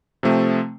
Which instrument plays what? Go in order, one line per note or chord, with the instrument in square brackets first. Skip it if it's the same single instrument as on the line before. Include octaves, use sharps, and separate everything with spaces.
[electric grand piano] C3 F3 A3 C4